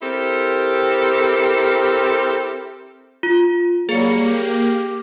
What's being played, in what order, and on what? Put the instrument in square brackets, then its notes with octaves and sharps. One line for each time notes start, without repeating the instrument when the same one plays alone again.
[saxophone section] C4 E4 G4 A4 A#4
[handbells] F4
[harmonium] F#3 G3 [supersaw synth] A#3 [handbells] G#4 C#7
[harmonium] G4